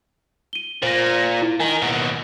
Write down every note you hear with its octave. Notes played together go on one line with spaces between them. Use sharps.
D#7 G7
A#2 C5 A#6
E4
D#3 G#5
D#2 B2